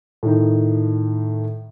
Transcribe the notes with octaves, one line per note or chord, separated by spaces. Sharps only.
A2 D#3 D#4